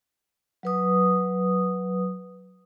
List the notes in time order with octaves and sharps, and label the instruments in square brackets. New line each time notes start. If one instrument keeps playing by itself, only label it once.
[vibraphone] F#3 B4 D#6